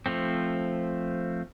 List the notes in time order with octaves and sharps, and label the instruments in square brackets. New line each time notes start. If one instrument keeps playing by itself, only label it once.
[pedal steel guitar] F3 A3 C4